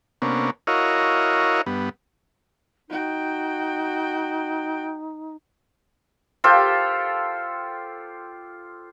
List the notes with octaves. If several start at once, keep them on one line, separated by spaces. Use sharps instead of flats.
C3 A#3 B3 C#4 D4
E4 F#4 A#4 C#5 D#5 F5
G2 B3
D#4 F#4 G5
F4 G4 A4 C5